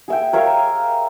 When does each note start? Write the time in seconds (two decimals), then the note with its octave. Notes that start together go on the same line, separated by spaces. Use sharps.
0.08 G#4 E5 G5
0.33 A#4 C#5 E5 F5